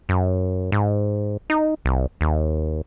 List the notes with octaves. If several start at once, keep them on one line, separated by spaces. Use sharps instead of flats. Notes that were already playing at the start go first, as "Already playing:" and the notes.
F#2
G#2
D#4
C2
D#2